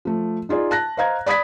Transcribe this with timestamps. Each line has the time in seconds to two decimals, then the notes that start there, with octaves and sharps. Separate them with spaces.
0.05 F3 A3
0.49 D#4 F4 G#4 D5
0.71 A5 F#6 A#6
0.97 C5 D#5 F5 A#5 G#6
1.26 D5 B5 D#6 G#6 B6